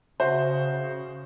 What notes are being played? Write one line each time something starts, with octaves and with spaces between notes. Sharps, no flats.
C#3 F#4 C5 E5